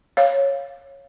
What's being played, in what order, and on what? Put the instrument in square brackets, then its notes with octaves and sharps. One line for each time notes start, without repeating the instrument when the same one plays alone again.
[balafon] C#5 F5